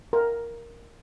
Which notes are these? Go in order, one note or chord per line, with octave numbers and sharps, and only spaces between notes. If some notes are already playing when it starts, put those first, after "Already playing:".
A#4